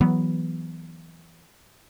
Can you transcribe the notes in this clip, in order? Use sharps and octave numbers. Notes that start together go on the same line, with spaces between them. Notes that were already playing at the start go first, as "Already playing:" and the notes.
E3 F#3 B3